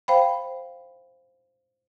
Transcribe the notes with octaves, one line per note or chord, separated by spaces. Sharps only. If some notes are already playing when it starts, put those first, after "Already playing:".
C5 F5 G5 B5